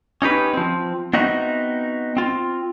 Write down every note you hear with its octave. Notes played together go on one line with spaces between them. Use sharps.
C#4 D#4 G4 B4
F3 C4
B3 C4 D#4 F#4 D#5 E5
C4 F4